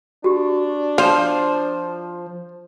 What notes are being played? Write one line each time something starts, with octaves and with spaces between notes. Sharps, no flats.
D4 F#4 G4
F3 C5 F5